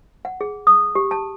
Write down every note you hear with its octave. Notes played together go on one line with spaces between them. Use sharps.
F#5
G#4
D#6
G4
A5